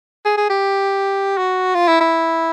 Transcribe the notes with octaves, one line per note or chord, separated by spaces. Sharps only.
G#4
G#4
G4
F#4
F4
E4
E4